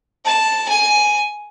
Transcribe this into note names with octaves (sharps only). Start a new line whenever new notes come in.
A5
G#5